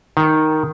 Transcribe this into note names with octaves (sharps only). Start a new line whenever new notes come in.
D#3